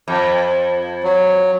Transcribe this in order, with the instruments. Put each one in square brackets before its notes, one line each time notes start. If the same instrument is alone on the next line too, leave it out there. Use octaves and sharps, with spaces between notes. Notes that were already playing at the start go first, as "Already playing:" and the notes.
[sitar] F2
[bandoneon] F#3